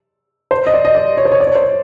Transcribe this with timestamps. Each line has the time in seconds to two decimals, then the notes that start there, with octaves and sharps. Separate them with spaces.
0.51 C5
0.67 D#5
0.74 D5
0.85 D#5
0.95 D5
1.17 C#5
1.25 C5
1.32 C#5
1.40 D5
1.47 C#5
1.55 C5
1.63 C#5